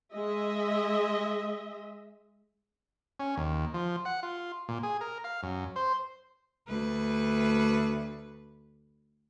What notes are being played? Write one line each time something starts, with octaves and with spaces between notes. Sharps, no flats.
G#3 D#5 E5
C#4
D#2
F3
F#5
F4
A#2
G#4
A#4
F5
F#2
C5
D2 B4